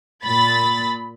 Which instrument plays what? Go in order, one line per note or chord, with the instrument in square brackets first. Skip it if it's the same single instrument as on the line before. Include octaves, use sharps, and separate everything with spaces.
[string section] A#2 B5 A6